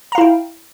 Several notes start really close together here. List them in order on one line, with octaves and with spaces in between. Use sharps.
A#5 F5 E4 G5